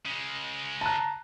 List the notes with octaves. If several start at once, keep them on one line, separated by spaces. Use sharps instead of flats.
C#3 G#3
A5 A#5 F#6